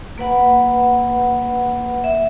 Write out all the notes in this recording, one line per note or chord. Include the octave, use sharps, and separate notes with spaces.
A#3 B4 F#5 B5
E5